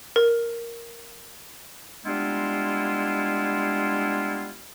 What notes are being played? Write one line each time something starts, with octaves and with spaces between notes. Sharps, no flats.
A#4
G3 G#3 B3 D4 E4 F4